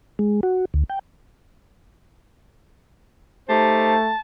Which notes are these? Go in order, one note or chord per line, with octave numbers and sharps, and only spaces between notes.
G#3
F#4
D2
G5
A3 D#4 G4 C5 A5